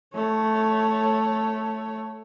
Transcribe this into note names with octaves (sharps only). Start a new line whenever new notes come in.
A3 C#5